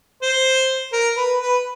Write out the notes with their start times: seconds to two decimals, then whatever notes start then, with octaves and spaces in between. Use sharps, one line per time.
0.22 C5
0.93 A#4
1.17 B4
1.40 B4